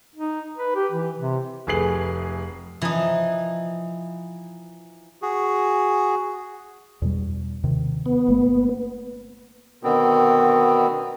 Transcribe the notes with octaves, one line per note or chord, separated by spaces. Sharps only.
D#4
B4
G4
E3
C3
F1 A3 G#4 B4 C7 F#7
E3 F3 D#4
F#4 G#4
E2 B2 G3
D#2 C3 D#3
B3
G1 A3 A#3
B2 D3 D#3 B3 C4